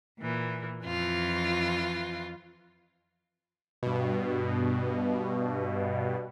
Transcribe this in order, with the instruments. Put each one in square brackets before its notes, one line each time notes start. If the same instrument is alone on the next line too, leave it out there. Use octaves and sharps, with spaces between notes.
[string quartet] A#2 E3
F2 E3 F4
[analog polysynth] G2 B2